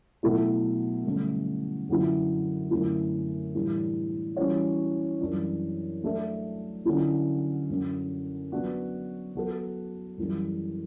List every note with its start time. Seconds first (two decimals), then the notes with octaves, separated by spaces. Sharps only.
0.23 B2 F#3 A3 E4 A4
1.05 G2 D3 F#3 A3 C#4
1.88 F#2 D3 F#3 C#4 E4
2.71 F#2 D3 A3 E4
3.54 A2 E3 G3 D4
4.36 E3 G3 C#4 F#4 C#5
5.20 F#2 E3 G3 D4
6.03 F#3 A3 D4 A4 E5
6.85 D3 F#3 C#4 E4
7.69 F#2 D3 F#3 C#4
8.52 F#3 B3 D4 F#4
9.35 F#3 B3 F#4 A4
10.18 F#2 E3 G3